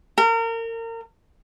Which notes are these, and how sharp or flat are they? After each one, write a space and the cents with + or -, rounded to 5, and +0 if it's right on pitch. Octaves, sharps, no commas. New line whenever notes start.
A#4 -30